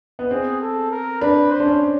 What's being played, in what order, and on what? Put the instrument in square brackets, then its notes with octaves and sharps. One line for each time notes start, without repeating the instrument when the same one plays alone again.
[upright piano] B3
[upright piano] C4 [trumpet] G#4
[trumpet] A4
A#4
[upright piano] D4 [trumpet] B4
[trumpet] C5
[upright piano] D4
C#4